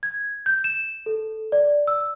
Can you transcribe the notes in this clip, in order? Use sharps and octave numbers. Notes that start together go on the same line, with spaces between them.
G#6
G6
E7
A4
D5
E6